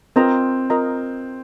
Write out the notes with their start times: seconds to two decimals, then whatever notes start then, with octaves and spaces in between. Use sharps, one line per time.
0.16 C4 F4 A#4 D#5 A#5
0.70 F4 A#4 D#5 A#5